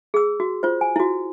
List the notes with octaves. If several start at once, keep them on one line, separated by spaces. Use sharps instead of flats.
G#4 E6
F#4
F4 C5
G#5
E4 F#4